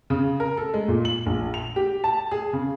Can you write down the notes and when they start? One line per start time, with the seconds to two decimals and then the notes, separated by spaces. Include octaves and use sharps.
0.10 C#3
0.40 A#4
0.57 A4
0.74 G#3
0.88 A#2
1.05 F#7
1.26 A#1
1.54 F7
1.76 G4
2.04 A5
2.31 G#4
2.53 C#3